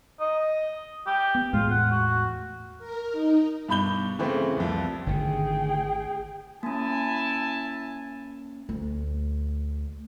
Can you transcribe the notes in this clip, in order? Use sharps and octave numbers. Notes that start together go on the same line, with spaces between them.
D#5
G4
B3
E2 A2 G#3 F4
F#5
F#4
A#4
D#4
G2 B2 B5 G6 G7
C#3 E3 A3 C4
C2 F2
G#1 D3 D#3 A3 G#4 G5
A#3 C#4 E4 G#5 A5
D2